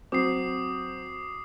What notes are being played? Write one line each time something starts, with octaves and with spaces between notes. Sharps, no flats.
F#3 C4 D6 D#6 C7